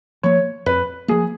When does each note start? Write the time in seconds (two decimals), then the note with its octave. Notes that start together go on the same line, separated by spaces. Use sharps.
0.23 F3 A#3 C#5
0.66 F2 B4
1.08 F3 A#3 G#4